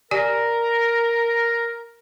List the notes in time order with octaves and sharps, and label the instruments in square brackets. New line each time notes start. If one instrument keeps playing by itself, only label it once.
[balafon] G4 D5 G#5 [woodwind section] A#4